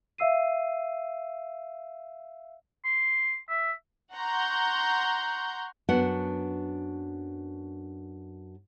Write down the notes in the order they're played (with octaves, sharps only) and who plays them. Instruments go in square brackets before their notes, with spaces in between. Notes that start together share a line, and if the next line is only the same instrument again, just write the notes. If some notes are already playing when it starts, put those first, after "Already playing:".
[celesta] E5 F5 E6 C7 D#7
[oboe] C6
E5
[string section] F#5 A#5 C6 C#6 G6
[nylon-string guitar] F#2 B3 D4 F#4 F#5